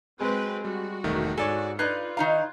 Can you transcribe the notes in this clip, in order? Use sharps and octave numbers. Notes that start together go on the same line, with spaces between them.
F#3 G#3 C4 B4
G3 F#4
E1 C2 D#3 A3
G#2 A4 C#5 D5 G#5
D#4 F4 B4 D5 F#6 G#6 C7
D#3 D#4 F5 A#5